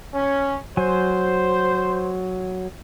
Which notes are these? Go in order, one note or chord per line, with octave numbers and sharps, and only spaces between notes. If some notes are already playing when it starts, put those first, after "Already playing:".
C#4
F#3 C5 G#5